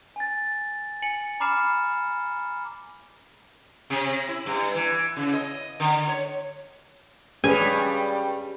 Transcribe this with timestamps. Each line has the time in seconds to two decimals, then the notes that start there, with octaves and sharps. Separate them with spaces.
0.16 G#5 A6
1.02 G#5 C#7 F#7
1.40 A#5 B5 D6 F6 C7 E7
3.90 C3
4.29 E4
4.46 G2
4.75 E3
5.17 C#3
5.34 D#5
5.80 D3
6.07 C#5
7.44 G2 G3 C#4 G#4 B4 G#5